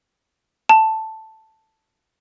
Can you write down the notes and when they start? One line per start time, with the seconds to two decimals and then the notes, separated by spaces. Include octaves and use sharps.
0.69 A5